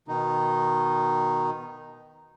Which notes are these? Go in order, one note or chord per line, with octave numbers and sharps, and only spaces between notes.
B2 D#3 D#4